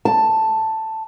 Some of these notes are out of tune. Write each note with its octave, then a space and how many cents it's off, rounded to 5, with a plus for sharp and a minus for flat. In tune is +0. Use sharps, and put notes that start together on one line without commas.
A5 +5